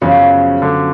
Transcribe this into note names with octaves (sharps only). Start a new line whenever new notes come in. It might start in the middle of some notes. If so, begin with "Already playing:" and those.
F#2 C#3 F3 B3
D3